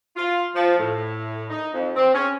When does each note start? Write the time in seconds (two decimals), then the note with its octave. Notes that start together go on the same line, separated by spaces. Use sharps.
0.17 F4
0.55 F3
0.78 A2
1.50 D#4
1.73 F2
1.96 C4
2.14 C#4